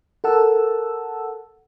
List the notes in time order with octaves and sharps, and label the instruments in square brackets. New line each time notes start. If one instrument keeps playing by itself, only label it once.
[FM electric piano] A4 A#4 F#5 A5 E6